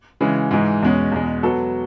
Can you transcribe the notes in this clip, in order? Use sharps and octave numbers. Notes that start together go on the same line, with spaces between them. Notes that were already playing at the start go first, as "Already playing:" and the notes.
C#3 E3 G#3
G#2 E3 G#3
E2 B2 G#3 C#4
E2 B2 G#3
F#3 B3 F#4 A4